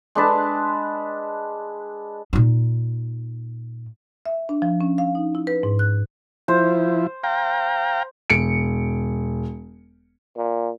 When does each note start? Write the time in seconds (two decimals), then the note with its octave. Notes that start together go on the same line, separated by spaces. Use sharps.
0.15 G#3 D4 B4 A5
2.33 A#2 D#4
4.26 E5
4.49 D4
4.62 F3
4.81 C#4
4.98 F5
5.15 D#4
5.35 E4
5.47 B4
5.63 G#2
5.79 F#6
6.48 F3 E4 C5
7.24 F5 G5 A#5
8.30 E1 C#7 D7
10.37 A#2